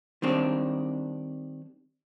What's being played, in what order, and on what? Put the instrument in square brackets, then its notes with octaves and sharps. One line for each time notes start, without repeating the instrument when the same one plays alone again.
[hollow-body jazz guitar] D#3 G3 C4 D4